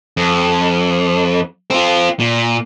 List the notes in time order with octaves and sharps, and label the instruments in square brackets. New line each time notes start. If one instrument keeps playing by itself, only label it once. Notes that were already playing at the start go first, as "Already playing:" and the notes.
[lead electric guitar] F2
C4 F4
A#2